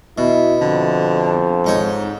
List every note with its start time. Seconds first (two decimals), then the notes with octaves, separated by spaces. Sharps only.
0.18 B2 E4
0.61 F2 D3
1.66 G#2 D#4 C#5